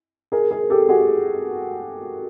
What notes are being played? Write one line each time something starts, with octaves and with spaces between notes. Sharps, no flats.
G#4 A#4
G#4 A#4
G4 A4
F#4 G#4